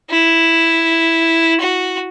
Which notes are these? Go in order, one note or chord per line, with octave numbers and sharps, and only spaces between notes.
E4
F#4